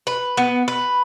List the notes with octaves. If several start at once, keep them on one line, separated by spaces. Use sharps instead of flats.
B4
B3
B4